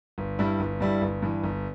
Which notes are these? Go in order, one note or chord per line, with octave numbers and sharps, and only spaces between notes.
G1
G2 G3 E4
G1
G2 G3 E4
G1
G2 E3
G1